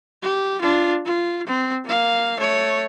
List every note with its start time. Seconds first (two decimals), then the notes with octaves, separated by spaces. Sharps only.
0.23 G4
0.61 D4 F4
1.06 F4
1.47 C4
1.85 A#3 F5
2.39 A3 C#5